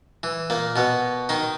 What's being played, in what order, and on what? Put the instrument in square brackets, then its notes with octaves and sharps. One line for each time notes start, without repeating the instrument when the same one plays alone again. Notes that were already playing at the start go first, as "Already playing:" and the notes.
[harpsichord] E3
A#2 A#3
B2 B3
D#3 D#4